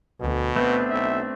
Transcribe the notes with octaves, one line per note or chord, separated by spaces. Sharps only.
D2 B2
A3 B3 C4 D4 B4
B1 E5